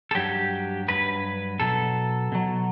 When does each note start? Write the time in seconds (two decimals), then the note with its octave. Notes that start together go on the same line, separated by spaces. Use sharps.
0.11 A4
0.15 G2 F#3 G4
0.88 G2 F#3 B4
1.60 B2 F#3 A4
2.32 B2 F#3